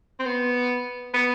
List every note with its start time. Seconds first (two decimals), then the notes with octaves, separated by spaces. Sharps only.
0.19 C4
0.26 B3
1.14 B3